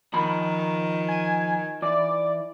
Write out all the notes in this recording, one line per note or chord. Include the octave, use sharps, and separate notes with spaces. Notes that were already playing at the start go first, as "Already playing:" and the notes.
D#3 F3 A#5 B5
G#5
E3 D5